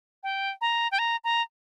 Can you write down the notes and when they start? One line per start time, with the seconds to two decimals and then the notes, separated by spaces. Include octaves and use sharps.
0.23 G5
0.61 A#5
0.92 G5
0.99 A#5
1.24 A#5